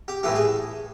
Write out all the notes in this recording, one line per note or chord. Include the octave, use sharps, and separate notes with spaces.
G4
A2 E3 A3 G4
G#4